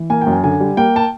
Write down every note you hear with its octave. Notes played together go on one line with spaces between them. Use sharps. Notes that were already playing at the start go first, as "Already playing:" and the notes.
Already playing: E3
A#3 G#5
G5
F#2
G#5
D3 G#5
G3
A#3 G5
A5